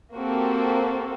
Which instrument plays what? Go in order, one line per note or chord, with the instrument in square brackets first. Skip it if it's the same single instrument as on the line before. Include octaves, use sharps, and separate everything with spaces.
[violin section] A#3 C4 F#4 G4 A4